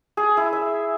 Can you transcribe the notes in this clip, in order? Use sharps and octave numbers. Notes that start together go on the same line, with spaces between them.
G#4
E4
E5